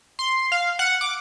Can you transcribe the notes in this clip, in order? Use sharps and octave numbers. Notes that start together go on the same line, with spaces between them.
C6
F5
F#5
D6